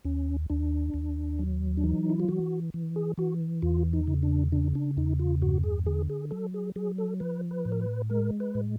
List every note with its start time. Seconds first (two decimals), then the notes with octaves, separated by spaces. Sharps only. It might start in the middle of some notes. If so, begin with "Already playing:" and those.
0.05 D#2 C#4
0.50 D#2 D4
0.94 D#2
1.39 F#3
1.77 D4
1.84 E3 D#4
2.10 E4
2.20 F4
2.28 E3 F#4
2.74 E3
2.96 G#4
3.18 E3 F#4
3.62 E2 F4
3.93 D#4
4.07 C#3
4.23 D4
4.52 C#3 D4
4.75 D4
4.97 E2 D#4
5.19 F4
5.42 G2 F#4
5.64 G#4
5.86 D3 G#4
6.10 G#4
6.31 F#3 A4
6.54 G#4
6.76 F#3 G#4
6.98 A4
7.20 F3 B4
7.51 B4
7.65 A2
7.72 A#4
7.81 B4
8.10 G#3 A#4
8.40 B4
8.55 A2